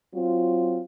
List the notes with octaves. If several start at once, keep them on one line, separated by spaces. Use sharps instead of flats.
F#3 C4 F4